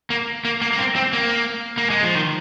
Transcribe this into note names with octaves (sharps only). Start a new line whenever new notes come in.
A#3
A#3
A#3
A#3
C4
C4
A#3
A#3
G#3
F3
D#3